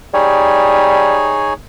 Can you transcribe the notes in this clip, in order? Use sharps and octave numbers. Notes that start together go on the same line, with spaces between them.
G3 D#4 G#4 C#5